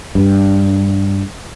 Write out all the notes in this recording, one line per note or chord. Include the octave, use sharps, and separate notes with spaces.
G2